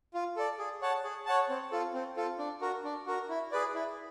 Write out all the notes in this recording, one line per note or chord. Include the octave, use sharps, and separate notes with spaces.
F4
A4 D5
G#4
C#5 F#5 A5
G#4
C#5 F#5 A5
C4
F4 A4
C4
F4 A4
D4
F#4 A#4
D4
F#4 A#4
E4
G#4 B4 D5
E4